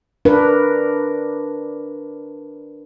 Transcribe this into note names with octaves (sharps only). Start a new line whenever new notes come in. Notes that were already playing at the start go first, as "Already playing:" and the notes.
D4 A#4 B4